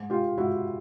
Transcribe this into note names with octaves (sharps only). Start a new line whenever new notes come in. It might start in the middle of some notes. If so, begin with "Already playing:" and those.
Already playing: G#2
G#3 F4 G4
G#2 E4 F#4